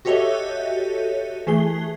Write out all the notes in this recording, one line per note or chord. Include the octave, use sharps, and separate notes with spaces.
F#4 G4 A4 C#5 D#5 E5
E3 A3 G#4 G7